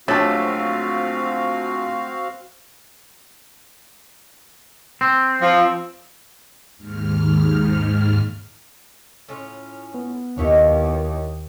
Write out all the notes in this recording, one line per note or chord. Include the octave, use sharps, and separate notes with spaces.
A#1 F#3 A3 C4 F#4 G4 A4 F5
C4
F3
D#2 G#2 F6
A2 C#4 F4
B3
D#2 D#4 E4 C#5